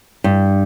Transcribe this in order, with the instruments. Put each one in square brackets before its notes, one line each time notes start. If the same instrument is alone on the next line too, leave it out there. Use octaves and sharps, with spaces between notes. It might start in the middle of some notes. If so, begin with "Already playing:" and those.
[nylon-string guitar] G2